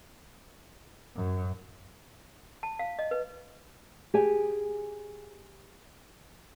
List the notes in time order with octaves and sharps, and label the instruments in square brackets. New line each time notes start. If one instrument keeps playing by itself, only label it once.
[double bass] F#2
[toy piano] A5
F5
D#5
B4
[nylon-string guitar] G4 G#4 G#5